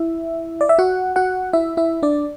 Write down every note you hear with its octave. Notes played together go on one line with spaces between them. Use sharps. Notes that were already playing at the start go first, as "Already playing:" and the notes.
Already playing: E4 E5
D5
E5
F#4 F#5
F#4 F#5
E4 E5
E4 E5
D4 D5